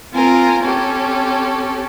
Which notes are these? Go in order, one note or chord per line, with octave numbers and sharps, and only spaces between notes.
C4 F4 A#4 G#5
C4 C#4 G4 A4